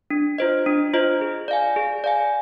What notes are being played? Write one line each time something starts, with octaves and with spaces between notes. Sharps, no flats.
D4
F4 C5 D#5
D4
F4 C5 D#5
G#4
D5 F5 G#5
G#4
D5 F5 G#5